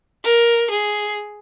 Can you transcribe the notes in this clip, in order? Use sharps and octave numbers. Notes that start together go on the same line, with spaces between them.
A#4
G#4